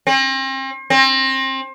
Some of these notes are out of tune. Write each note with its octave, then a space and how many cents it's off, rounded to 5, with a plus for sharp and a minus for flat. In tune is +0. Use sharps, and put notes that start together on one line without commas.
C4 +40
C4 +30